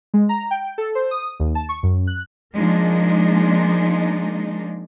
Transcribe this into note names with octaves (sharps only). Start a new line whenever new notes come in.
G#3
A#5
G5
A4
C5
D#6
D#2
A5
C#6
F#2
F#6
F3 G#3 A#3 D4 D#4